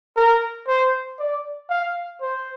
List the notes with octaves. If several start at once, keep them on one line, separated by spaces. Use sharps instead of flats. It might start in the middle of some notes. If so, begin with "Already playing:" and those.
A#4
C5
D5
F5
C5